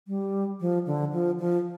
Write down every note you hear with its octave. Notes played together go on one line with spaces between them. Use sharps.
G3
F3
D3
F3
F3